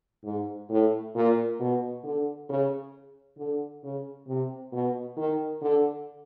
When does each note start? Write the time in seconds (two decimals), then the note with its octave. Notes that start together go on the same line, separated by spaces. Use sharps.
0.24 G#2
0.70 A2
1.15 A#2
1.60 B2
2.03 D3
2.49 C#3
3.38 D3
3.83 C#3
4.28 C3
4.72 B2
5.16 D#3
5.61 D3